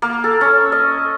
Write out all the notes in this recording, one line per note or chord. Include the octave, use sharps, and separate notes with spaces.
A#3
A4
C#4
D#5